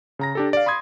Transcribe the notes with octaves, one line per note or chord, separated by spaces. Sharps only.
C#3 A#5 A#6
D4 G4 A4
D5 F5
B5 C6 D#6 G#6